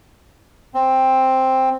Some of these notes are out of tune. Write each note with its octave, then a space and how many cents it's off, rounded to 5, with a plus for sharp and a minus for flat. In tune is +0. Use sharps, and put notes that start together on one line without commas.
C4 +5